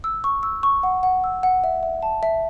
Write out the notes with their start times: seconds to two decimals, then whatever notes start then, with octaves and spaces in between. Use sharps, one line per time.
0.04 E6
0.24 C#6
0.43 E6
0.63 C#6
0.83 F#5
1.03 F#5
1.24 E6
1.43 F#5
1.64 E5
1.83 E5
2.02 A5
2.23 E5